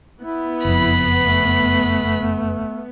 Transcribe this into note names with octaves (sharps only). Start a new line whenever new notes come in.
B3 E4
F#1 F2 B5
A3